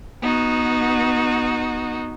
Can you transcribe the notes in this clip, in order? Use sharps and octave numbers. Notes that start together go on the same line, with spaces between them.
B3 D#4 F#4